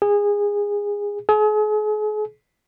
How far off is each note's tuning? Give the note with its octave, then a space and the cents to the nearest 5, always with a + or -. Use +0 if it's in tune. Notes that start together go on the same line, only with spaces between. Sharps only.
G#4 -20
G#4 +40